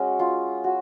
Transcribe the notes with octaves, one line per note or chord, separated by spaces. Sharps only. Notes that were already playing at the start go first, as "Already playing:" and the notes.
Already playing: G#3 C#4 F#4
F4
F#4